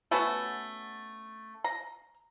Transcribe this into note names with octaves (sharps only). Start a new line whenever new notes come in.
A3 B3 C#4 F#4
A#5